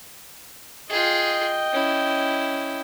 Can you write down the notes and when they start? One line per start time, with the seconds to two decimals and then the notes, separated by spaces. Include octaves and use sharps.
0.90 F4 G#4 D#5 G5
1.73 C#4 E4